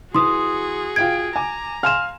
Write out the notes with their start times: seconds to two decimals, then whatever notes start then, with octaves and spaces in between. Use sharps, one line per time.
0.15 E3 F#4 G#4 C6 D#6
0.96 F4 G5 G#6 D7
1.36 G#5 A#5 D6
1.83 F5 G#5 C6 F6 E7